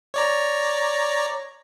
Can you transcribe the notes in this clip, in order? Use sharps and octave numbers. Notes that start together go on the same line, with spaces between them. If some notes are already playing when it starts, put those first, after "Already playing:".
C#5 D5 A#5